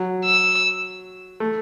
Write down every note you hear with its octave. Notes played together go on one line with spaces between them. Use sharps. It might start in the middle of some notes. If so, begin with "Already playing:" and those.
Already playing: F#3
E6
A3